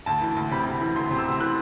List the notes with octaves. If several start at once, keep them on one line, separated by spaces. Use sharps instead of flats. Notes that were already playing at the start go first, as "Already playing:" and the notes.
D2 A5
E3
D2
C3 B5
D2
E3
D2 C6
C3
E6
D2
E3 F#6